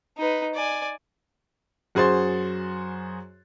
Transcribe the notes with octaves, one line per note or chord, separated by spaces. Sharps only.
D#4 B4
D5 G#5
F#2 F#4 G#4 C5 C6 A6